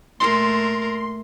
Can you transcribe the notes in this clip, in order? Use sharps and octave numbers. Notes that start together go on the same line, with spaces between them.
A#2 A3 A#4 C6